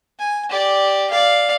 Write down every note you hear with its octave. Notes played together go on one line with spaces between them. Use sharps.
G#5
G4 D5
D5 F5